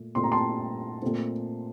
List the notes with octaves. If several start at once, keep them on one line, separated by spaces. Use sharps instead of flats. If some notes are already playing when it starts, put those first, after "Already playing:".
Already playing: A#2 A3
A#2 A3 C4 C6
A#5
A5 C6
A#2 A3 C4